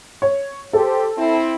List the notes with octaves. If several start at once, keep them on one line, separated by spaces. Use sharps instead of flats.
C#5
G4 A4 C5
C4 E4